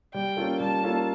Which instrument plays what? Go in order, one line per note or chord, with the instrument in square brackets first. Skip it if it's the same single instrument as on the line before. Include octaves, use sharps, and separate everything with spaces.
[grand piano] G3 [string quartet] G5
[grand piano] A#3 C#4 F4 A4
[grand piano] G3 [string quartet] A5
[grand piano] A#3 C#4 F4 A4